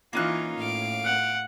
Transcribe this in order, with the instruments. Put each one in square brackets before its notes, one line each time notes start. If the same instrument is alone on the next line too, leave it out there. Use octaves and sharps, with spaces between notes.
[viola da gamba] E3 D#4 F4 [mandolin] A#3 C#4 F#6
[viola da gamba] A2 [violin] F5 D7
[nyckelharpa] F#5